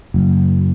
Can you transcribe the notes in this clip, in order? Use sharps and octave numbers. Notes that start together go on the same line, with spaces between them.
F#1